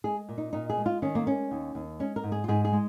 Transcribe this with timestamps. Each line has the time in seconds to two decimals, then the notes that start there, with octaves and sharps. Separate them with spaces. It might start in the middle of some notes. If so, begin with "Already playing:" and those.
0.04 G#3 G#4
0.29 A#2
0.38 D#4
0.53 A#2 D#4
0.69 G#4
0.78 G#3
0.86 F4
1.02 D#3 C#4
1.15 A#3
1.27 G#3 C#4
1.51 D#2
1.75 D#2
2.00 G#3 C#4
2.16 A#4
2.23 G#2
2.32 G#4
2.44 F4
2.48 G#2 G#4
2.65 G#4
2.72 G#3